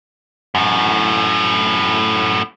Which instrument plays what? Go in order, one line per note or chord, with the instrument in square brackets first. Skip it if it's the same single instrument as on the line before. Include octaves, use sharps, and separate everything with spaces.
[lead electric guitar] F#2 A2